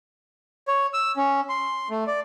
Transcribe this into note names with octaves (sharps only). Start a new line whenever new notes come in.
C#5
E6
C#4
C6
A3
D5